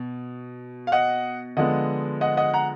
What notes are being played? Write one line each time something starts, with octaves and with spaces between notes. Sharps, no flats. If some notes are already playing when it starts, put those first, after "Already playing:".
Already playing: B2
F5
D#5 F#5
D3 F3 G#3 B3 D#5 F#5
D#5 F#5
D#5 F#5
F#5 A#5